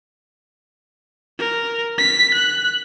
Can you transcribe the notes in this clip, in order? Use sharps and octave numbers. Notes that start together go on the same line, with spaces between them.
A#4
B6
F#6